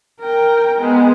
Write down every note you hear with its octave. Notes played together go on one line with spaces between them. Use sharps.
A#4 G5
G#3 B3